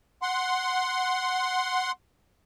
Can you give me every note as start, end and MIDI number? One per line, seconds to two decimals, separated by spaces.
0.22 1.91 78
0.22 1.91 84